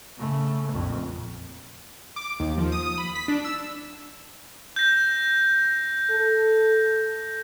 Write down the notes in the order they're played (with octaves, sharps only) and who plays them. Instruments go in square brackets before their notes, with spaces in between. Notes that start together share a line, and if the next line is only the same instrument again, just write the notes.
[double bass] C#3 A3
A#1 F2
[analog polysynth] D6
D#2
F3
D#6
B5
B6
D4
E6
[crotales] G6 A#6
[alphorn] A4